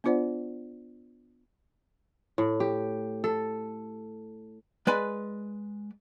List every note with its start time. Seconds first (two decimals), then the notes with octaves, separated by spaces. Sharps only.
0.04 B3 D4 F4 C5 D5 F#5
2.38 A2
2.60 G4
3.24 A4
4.87 G#3 B4 D5 G#5 B5